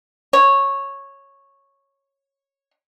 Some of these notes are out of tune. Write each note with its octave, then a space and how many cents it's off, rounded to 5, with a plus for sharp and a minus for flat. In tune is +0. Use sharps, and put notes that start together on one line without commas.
C#5 -10